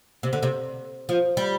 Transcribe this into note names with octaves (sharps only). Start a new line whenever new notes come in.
C3
D3
C3
F3
G3